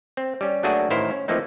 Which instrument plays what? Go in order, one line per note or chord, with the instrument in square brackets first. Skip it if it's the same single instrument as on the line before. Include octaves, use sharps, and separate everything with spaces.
[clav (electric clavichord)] C4
G3 C#4
F#3 A3 A#3 D4 F#4 G#4
A1 D#3 E4 A#4 C5 F5
C#4
E3 F3 A3 A#3 C4 D#4